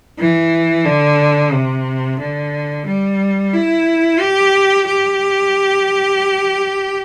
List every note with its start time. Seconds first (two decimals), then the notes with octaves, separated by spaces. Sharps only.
0.19 E3
0.86 D3
1.52 C3
2.20 D3
2.86 G3
3.53 E4
4.20 G4
4.87 G4